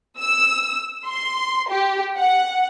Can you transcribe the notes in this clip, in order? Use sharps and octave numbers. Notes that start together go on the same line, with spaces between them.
E6
C6
G4
F#5